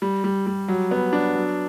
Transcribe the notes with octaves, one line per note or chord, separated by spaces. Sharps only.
G3
G3
G3
F#3
B3
D4
F#3